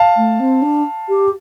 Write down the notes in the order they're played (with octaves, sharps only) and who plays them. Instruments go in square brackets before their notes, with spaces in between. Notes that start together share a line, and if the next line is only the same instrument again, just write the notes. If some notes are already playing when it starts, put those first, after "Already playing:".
Already playing: [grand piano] F5 A5
[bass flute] A3
C4
D4
G4